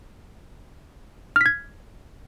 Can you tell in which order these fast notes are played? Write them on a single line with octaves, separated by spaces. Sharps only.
F6 B6 G#6